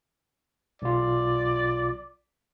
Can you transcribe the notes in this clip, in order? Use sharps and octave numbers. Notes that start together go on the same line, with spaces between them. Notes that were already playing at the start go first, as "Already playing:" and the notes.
B1 F4 D5